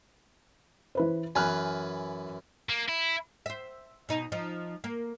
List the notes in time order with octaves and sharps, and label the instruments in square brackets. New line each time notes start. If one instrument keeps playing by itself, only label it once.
[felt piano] E3 B4 C5
[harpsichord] F#2 E3 B4 [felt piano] G#5 F6 F#6
[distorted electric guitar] A#3
E4
[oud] C5 E5
B2 D#4
F3 D#4
A#3